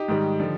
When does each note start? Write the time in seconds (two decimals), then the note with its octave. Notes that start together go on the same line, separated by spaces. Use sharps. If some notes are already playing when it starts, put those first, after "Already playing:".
Already playing: D#4 G4
0.08 G#2 D#3 G3
0.40 D3 F3